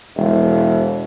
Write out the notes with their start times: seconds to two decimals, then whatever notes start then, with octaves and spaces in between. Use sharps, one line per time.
0.16 E1